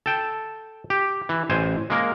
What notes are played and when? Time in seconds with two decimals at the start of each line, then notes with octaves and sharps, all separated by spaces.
0.06 A4 G5 A5
0.90 G4
1.29 E3
1.50 A1 C5 G#5
1.90 G#3 A#3 A#4